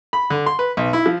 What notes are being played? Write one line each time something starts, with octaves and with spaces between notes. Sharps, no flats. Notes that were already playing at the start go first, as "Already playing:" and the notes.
B5
D3
C6
B4
B1
E4
F3